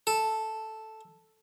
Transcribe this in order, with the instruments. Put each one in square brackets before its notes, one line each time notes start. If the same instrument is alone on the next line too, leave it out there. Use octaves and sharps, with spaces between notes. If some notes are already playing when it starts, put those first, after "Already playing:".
[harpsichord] A4